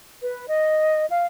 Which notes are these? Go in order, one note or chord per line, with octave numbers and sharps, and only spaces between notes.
B4
D#5
F5